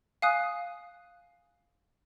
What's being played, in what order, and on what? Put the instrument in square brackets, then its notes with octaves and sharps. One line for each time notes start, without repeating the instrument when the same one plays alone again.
[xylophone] F5 G#5 D#6 F#6